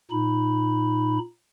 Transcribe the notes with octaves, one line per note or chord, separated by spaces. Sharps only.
A#2 D#4 B5